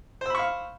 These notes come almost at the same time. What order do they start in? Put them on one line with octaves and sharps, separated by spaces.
C5 E6 B5 C#6 F5